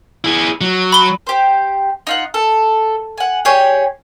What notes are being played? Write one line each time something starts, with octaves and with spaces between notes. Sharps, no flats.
E4 G#4
F#3
B5 G7
G4 C5
D#4 F4 F#5
A4
F#5 G#5
G4 G#4 C#5 D5